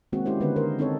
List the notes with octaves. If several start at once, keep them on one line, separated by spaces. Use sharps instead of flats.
D#3 G#3 A#3 C4 F#4
G#3 C#4 E4 G4 C5
D3 D#3 B3 B4
B3 A#4 C5 D#5
C4 D#4 A4 C#5